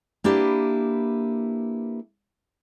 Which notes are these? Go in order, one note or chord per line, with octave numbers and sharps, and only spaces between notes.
A#3 D4 E4 G4 B4